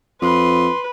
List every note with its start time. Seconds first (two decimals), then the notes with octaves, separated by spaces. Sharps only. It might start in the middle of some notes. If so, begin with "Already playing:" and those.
0.22 F2 B4 C6